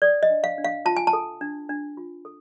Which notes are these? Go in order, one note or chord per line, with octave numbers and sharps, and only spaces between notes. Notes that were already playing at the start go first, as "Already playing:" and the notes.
A4 D5
D#5
D4
F5
D4
F5
F4 A5
G#5
A5
A4
D4
D4
F4
A4